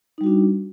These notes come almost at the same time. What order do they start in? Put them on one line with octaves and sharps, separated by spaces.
D#4 G3 F#4 D4